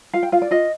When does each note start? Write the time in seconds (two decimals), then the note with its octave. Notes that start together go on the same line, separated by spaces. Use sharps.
0.13 F4 F5
0.23 G5
0.32 F4 F5
0.42 D5
0.51 F4 D#5